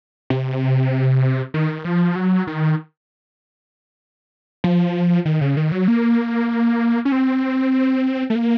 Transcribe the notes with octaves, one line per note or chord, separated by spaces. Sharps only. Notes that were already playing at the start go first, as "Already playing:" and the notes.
C3
D#3
F3
F#3
D#3
F3
D#3
C#3
D#3
F#3
A#3
C#4
C4
A3
A#3